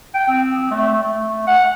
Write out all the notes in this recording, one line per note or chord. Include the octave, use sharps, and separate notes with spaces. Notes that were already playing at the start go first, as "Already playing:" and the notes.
G5
C4
A3
A3
F#5